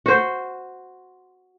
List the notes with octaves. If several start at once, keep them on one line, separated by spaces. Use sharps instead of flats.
F#4 C5